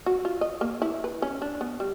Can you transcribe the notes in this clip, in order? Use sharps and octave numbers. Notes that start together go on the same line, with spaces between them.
F#4
F4
D#5
A#3
E4
B4
C#4
D4
B3
G3